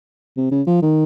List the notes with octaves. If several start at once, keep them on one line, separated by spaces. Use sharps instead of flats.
C3
C#3
F3
D#3